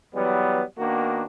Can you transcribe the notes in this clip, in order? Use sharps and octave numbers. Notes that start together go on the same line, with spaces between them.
E3 F#3 G3 B3
D#3 A#3 B3 D4 F#4